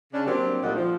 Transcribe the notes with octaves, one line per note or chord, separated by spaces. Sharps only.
C#3 D4
F#3 G3 A#3 C4 D4 G4
D2 G2 A#2 D#4 D5 F#5
F3